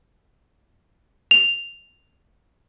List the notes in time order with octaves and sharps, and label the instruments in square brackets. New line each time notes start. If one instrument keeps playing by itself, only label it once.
[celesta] F7